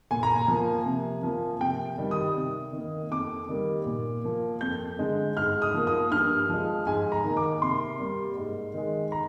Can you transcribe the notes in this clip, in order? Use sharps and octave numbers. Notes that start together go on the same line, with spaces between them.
A#2 G#5
A#5
G#5
F3 A#3
C3
F3 A#3
C3 G5
D#3 G3
D#6
C3
D#3 A#3
F2 D6
D#3 G3 A#3
A#2
F3 A#3
F2 G6
D3 G#3
G#2 F6
D#6
F3 A#3
D#6
G2 F6
F3 G#3
G#2 G#5
A#5
D#3
A#3
D6
C3 C6
G3 A#3
G#2
D#3 G#3
A#5